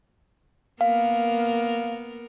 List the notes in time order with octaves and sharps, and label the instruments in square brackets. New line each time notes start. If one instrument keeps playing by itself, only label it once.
[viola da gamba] A#3 B3 A#4 [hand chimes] F5